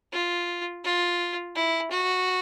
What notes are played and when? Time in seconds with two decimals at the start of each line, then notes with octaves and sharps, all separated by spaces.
0.13 F4
0.84 F4
1.55 E4
1.91 F#4